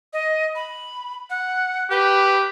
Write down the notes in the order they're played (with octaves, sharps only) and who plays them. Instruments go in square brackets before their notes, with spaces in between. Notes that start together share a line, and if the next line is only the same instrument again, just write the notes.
[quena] D#5
B5
F#5
[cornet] G4 [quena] B4